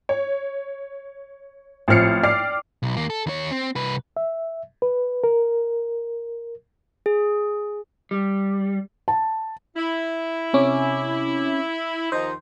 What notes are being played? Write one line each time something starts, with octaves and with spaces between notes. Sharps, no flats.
C#5
A1 F3 C4 F6 C7 C#7
D5 G5 D6 F6 C7
B1
D#2 A#3
A4
D#2 C#5
C4
C2 B4
E5
B4
A#4
G#4
G3
A5
E4
C3 C#4 D6
D#2 F3 D#4 C5